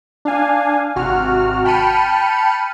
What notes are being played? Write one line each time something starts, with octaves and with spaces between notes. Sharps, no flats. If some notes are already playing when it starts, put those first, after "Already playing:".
D4 F5 G#5
G#1 C3 F#4 F6
G5 A5 B5 F6 C#7 D#7